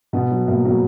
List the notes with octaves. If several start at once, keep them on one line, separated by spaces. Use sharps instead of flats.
B2 B3
F#3
B2 A#3
F#3 A#3